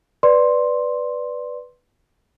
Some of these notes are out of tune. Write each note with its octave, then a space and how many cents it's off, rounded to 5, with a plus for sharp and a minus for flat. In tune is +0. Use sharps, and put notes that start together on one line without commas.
B4 +0 D5 +0 C6 +5